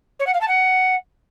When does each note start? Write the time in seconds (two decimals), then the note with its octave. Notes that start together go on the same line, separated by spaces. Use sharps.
0.19 C#5
0.27 F#5
0.34 F5
0.41 A5
0.48 F#5